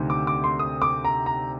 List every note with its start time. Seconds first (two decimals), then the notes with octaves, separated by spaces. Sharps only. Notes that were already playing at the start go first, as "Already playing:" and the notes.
Already playing: D2 C3 D#3
0.10 D6
0.27 D6
0.44 C6
0.59 D#6
0.82 D6
1.05 A#5
1.26 A#5